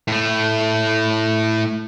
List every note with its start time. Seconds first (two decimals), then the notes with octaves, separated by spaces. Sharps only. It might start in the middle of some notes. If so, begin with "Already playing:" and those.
0.08 A2 A3